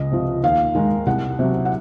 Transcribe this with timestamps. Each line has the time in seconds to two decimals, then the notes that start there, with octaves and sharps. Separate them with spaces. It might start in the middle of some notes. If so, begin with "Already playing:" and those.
Already playing: C#2 D#5
0.11 C3 F3
0.43 D#2 F5
0.75 D#3 G#3 D#4
1.06 C2 F#5
1.39 C3 F#3
1.65 F#5